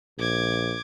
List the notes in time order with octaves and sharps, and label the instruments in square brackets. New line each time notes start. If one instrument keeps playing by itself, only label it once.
[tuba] A#1 [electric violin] D6 G#6